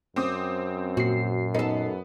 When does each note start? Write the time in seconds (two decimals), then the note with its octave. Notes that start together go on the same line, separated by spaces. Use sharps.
0.16 F#2 C4 D6 D#6
0.97 A#2 F#4 C7
1.55 B3 D#4 A4